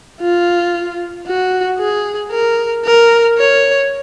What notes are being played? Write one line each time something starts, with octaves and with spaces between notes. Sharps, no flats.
F4
F#4
G#4
A#4
A#4
C#5